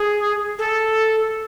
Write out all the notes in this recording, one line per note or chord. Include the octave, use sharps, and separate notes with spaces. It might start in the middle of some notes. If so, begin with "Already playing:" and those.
Already playing: G#4
A4